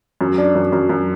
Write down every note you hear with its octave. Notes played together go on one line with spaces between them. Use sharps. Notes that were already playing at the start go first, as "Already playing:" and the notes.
F#2
D4
F#2
F#2
F#2